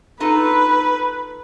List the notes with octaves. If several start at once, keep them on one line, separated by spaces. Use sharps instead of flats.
D#4 F4 A4 B4